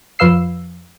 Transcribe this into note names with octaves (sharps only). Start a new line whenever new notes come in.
F2 F3 B4 F5 E6 C7